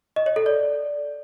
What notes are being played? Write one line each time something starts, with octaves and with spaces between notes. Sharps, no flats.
D#5
C#5
A4
D5